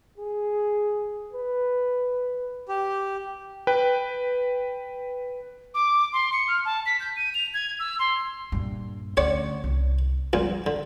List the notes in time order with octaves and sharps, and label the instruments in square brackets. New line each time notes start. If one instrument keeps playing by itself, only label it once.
[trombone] G#4
B4
[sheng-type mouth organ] G4
[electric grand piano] B4 G5
[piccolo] D6
C6
C#7
F6
A5
B6
G6
D#7
F7
G#6
E6
C6
[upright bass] G2 A#2
[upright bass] D2 C#4 [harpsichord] C#5 D5 F#5
[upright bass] C2
[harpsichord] C#2 A#2 [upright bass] F3 G3
[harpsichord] D3 [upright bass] E3